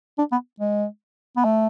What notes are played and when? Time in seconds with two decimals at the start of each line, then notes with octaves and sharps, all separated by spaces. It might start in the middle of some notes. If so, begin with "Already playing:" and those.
0.18 D4
0.32 B3
0.60 G#3
1.37 B3
1.45 A3